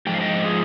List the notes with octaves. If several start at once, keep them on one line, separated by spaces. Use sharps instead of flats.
G#2 F3 G5
F5
D#5 G5
F4 G#4